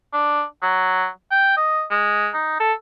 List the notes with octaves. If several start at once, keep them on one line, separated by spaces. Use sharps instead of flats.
D4
F#3
G5
D#5
G#3
D#4
A4